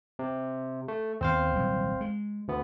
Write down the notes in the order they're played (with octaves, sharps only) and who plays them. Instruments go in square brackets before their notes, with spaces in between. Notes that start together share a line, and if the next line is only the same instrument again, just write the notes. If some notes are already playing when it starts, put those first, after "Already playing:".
[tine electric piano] C3
A3
[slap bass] D#2 B3 [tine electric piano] C4 C5 F5
[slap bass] D#1 C2 F#3
G#3
[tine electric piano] D2 B3